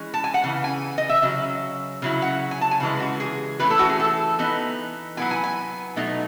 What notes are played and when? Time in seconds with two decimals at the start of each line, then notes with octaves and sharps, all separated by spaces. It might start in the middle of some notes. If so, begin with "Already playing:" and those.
Already playing: E3 G#3 C#4
0.14 A5
0.24 G#5
0.34 F#5
0.44 C#3 E3
0.64 G#5
0.98 D#5
1.09 E5
1.23 C#3 F#3
2.02 C#3 F#3 E4
2.22 F#5
2.51 G#5
2.61 A5
2.71 G#5
2.80 C#3 E3 G#3
3.00 F#4
3.20 G#4
3.60 E3 A3 C#4 B4
3.70 A4
3.79 F#4
3.89 G#4
4.00 A4
4.39 E3 B3 D#4
5.17 F#3 B3 E4 G#5
5.31 G#5
5.44 G#5
5.96 B2 F#3 A3 D#4